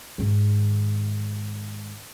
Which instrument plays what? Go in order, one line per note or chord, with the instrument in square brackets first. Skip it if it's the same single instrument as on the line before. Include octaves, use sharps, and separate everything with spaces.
[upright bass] G#2 D#3